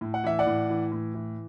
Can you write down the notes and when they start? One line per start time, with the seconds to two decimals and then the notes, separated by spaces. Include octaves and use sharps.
0.01 A2
0.14 F#5
0.24 E3 E5
0.39 D5 F#5
0.46 A2
0.70 E3
0.92 A2
1.14 E3